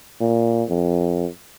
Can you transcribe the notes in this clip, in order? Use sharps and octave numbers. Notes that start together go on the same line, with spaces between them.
A#2
F2